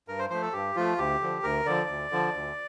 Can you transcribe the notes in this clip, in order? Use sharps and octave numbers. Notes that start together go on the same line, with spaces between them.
G2 A#4
C5
F3 A3 C5
A4
G2 G4
F3 A3 F4
D2 G4
D3 F3
D2 A#4
D3 F3 D5
D2
D3 F3
D2